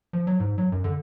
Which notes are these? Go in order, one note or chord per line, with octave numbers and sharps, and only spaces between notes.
F3
F#3
G#2
F#3
F#2
D3